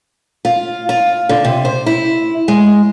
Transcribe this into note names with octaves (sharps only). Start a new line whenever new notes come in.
F4
F4
D3
C3
C5
E4
G#3